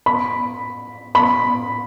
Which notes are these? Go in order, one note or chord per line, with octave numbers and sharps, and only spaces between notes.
B5
B5